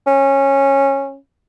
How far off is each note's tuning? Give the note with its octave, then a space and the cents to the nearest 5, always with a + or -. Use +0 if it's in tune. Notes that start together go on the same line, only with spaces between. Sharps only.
C#4 -15